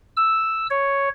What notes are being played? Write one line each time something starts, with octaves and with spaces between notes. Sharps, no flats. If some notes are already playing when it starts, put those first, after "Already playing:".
E6
C#5